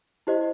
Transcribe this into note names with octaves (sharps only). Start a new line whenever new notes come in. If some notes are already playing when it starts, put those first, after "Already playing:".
E4 G4 C5 D#5